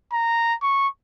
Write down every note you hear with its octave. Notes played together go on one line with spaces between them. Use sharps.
A#5
C#6